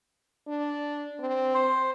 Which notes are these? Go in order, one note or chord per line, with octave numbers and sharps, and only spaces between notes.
D4
C4
C5